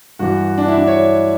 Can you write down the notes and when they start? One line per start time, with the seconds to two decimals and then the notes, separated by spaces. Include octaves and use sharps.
0.19 G2 E3 F#4
0.58 D4
0.68 E4
0.78 D4
0.87 C#5